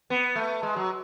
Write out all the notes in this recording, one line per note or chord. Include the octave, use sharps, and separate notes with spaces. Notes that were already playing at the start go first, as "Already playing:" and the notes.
B3
A3
G#3
F#3